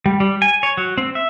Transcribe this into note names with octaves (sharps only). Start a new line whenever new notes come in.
G3
G3
G#5
C#5
F#3
C4
E5